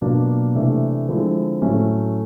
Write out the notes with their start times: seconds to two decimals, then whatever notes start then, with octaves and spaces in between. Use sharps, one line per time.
0.01 B2 F#3 A#3 D4 F4
0.55 C3 E3 A3 D4
1.08 D3 F3 G#3 C4 E4
1.62 A2 F#3 A3 C#4